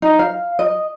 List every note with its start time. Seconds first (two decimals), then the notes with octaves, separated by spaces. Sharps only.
0.02 D#4
0.19 F5
0.59 D#5